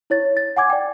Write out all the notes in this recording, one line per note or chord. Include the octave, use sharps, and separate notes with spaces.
E4 C#5 A6
A6
F#5 G#5 D6 G#6
D5 G5